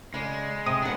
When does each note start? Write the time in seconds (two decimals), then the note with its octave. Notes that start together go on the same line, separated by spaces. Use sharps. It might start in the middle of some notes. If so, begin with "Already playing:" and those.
0.14 C#3 G#3 D5
0.66 C3 D#6
0.82 G3 B3 D4 F#5